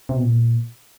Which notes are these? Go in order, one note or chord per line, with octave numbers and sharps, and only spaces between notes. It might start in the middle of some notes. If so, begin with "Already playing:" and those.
C3
B2
A#2